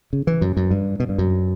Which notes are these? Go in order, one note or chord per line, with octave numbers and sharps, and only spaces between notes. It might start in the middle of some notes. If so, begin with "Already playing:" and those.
C#3
E3
F#2
F#2
G2
B2
G2
F#2